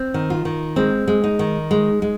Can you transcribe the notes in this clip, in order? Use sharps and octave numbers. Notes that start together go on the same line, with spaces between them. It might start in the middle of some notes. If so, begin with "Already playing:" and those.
Already playing: C4
D#3
F4
D#3
G#3 C4
G#3
D#4
D#3
G#3
G#3